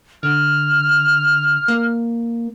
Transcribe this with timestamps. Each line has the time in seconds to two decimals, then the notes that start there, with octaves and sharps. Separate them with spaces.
0.23 D3 F6
1.68 A#3